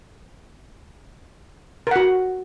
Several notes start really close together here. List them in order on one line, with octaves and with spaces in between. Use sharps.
A#4 F#5 F#4